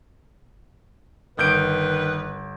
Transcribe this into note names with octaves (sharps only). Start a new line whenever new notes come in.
G1 D#3 B4 G6 D7